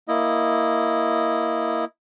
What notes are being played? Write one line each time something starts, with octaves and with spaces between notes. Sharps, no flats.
A#3 E4 D#5